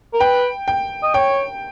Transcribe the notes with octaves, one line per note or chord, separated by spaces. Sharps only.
A#4
B4 G5
G5
D#5
C#5 G5